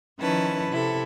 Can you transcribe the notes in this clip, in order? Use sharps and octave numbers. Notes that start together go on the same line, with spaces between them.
D#3 F3 C#4 E4 B4 A5
C3 E4 A4